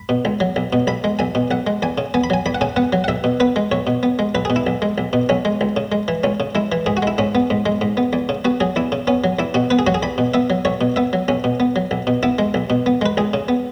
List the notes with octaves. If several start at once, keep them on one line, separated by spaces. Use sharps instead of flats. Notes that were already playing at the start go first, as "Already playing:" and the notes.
Already playing: B5
B2
C#2
F#3
B1
B2
B1 B5
G#3
B1 G#5
B2
B1 F#5
G#3
E2 G#5
C#3
B3 G#5
B5
F#3 G#5
E2 B5
F#5
C#3 G#5
B3 F#5
F#3
F#5
B1 E5
B2
B3 B4
G#3
B1 C#5
B2
B3
G#3
B1 B4
G#4
B2
E4
B1
G#3
B1
B2
B1 C#4
G#3
C#2
C#3
G#3
E3
C#2 C#4
C#3
G#3 E4
E3
G#2 G#4
F#4
G#3 E4
G#2 C#4
B3
G#2
G#3
G#2
B3
E2
C#3
B3 F#4
F#3 G#4
E2 E4
C#3
B3 C#4
F#3
E2 E4
B2 F#4
B3 B4
G#4
F#3 F#4
G#4
E2 B5
B2
B3 E5
F#3
B1 C#5
B2
B3 E5
F#3
B1 C#4
B2
B3
F#3
B1
B2
B3 E4
G#3
B1
B2
B3
G#3 B4
C#2 G#4
C#3
B3